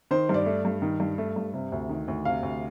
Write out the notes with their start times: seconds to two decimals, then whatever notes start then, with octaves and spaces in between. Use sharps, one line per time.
0.11 D#3 C5
0.29 G2 D5
0.46 A3
0.65 G2
0.82 D#3
1.00 G2
1.18 A3
1.36 G2
1.54 C3
1.72 D2
1.89 D#3
2.08 D2
2.25 C3 F5
2.43 D2